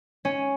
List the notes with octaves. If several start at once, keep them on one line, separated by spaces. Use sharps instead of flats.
C#4